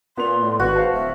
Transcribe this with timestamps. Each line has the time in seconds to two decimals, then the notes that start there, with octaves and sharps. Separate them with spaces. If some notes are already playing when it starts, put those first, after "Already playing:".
0.17 A#2 B3 C6 F7
0.43 A2 D5
0.60 G#1 F#4 B4
0.75 C5 F5 A5
0.94 D1 E5